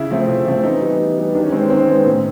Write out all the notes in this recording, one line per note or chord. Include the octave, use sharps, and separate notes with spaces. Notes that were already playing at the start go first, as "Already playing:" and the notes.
Already playing: C#3 E4
F3 A3 C4
C#3
F3 A3 C4
E3 D#4
G3 B3
E3
G3 B3
D#3 D4
C#4
G#3 B3 C4
C#4
D#3 C4
G#3 B3
A2